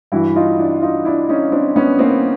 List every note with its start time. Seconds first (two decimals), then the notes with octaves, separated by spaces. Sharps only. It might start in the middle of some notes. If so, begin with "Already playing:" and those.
0.12 G2 E3 E4 F#4
0.36 D#4 F4
0.59 D4 E4
0.82 D#4 F4
1.05 D4 E4
1.29 C#4 D#4
1.52 C4 D4
1.76 B3 C#4
1.99 A#3 C4